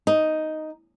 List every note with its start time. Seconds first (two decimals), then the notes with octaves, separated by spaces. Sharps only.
0.07 D#4